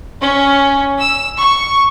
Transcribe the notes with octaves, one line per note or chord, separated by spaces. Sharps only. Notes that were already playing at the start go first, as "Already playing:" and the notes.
C#4
E6
C#6